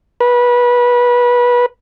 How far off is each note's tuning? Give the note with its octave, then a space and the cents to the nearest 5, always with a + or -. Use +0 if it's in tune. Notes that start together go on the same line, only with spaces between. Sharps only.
B4 -25